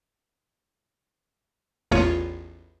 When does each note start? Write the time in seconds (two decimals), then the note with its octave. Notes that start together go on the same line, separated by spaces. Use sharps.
1.91 A1 E2 F4 C#5 D#7